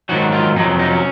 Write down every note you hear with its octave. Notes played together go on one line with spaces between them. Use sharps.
G#2 D#3 F#3 F#4
F4
F2 C3 F#3 D#4
D#4
C#4